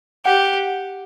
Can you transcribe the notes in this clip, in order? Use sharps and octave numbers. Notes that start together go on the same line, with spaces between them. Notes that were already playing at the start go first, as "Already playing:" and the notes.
G4 F#5